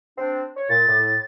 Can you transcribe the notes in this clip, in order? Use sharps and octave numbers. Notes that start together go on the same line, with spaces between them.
C4 D4
C#5
A#2 A6
A2